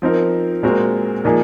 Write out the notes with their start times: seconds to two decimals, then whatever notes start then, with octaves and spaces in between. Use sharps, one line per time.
0.02 F3 C4 D#4 A#4
0.63 A#2 G#3 C4 F#4 A#4
1.25 A#2 F3 A#3 D#4 G#4